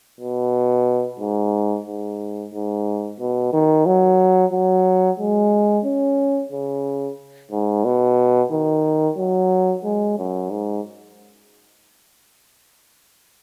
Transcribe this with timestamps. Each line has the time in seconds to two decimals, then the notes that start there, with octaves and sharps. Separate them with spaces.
0.20 B2
1.20 G#2
1.86 G#2
2.53 G#2
3.20 B2
3.53 D#3
3.86 F#3
4.52 F#3
5.20 G#3
5.85 C#4
6.52 C#3
7.51 G#2
7.85 B2
8.51 D#3
9.18 F#3
9.84 G#3
10.18 F#2
10.50 G#2